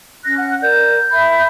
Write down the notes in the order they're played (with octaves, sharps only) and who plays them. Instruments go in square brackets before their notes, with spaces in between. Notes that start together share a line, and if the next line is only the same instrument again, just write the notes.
[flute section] C#4 F#6 [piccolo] A#6
[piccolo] F#5
[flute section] A#4 D5 [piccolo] G6
[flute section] E5 B5